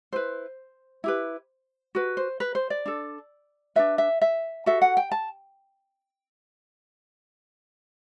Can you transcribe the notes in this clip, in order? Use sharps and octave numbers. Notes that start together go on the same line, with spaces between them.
E4 B4 C5
E4 G4 B4
F#4 B4
C5
B4
C5
D5
D4 A4
D4 F#4 B4 E5
E5
E5
F#4 A4 E5
F#5
G5
A5